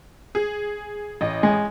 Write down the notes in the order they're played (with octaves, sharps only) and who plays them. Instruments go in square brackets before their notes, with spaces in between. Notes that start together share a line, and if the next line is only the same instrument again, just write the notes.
[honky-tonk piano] G#4
A1 D#5
[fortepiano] G#3